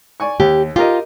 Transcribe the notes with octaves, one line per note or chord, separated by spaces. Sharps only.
D5 G#5 C#6
D#2 G4
F4 G4 A#4 D#5